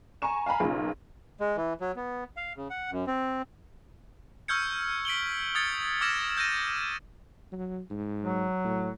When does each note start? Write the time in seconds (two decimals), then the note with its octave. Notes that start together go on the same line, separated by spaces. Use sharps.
0.22 G#5 A#5 C#6 E7
0.46 F5 G#5 A#5 B5
0.60 B1 C#3 A#3 F4
1.40 G#3
1.57 E3
1.81 F#3
1.96 B3
2.37 F5
2.57 C#3
2.70 F#5
2.91 F#2
3.07 C4
4.48 C#6 E6 F6 G6 G#6 C#7
5.05 B6 D7 F#7 G7
5.55 D#6 G#6 A6 C#7
6.01 D6 E6 F6 G#6 A#6 E7
6.37 E6 G6 G#6 A#6 D#7
7.52 F#3
7.91 G#2
8.23 F#3
8.64 A2